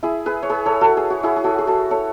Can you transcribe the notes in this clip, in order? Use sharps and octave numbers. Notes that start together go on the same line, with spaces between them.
E4 G#4
G#4 B4
C#5
G#4 B4
A4 C#5
F#4 A4
G#4
F#4
E4 G#4
G#4
F#4 A4
G#4
F#4 A4
A4 C#5